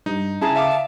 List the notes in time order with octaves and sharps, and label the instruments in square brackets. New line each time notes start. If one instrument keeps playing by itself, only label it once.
[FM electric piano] G2 [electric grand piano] D#4
[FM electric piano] C#3 [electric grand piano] E4 G#4 A#5 [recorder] A5
[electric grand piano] E5 F5 D6
[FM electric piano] D#5